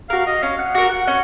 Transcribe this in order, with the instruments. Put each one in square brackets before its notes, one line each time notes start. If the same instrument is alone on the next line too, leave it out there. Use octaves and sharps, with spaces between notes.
[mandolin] F#4 A#4 [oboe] F5
[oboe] D#5
[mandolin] C#4 [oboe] F5
[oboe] F#5
[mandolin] F#4 A#4 [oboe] F#5
[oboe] F#5
[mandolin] C#4 [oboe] F#5